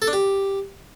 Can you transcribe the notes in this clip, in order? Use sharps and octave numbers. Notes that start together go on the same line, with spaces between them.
A4
D4
G4